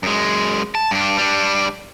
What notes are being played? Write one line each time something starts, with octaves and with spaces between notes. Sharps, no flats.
F#2 G#3
A5
G2 D4
G3 D4